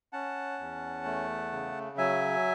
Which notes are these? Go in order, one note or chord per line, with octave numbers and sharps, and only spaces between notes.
C#4 F#5 A5
E2
A3
C#3
F#3 E5 G#5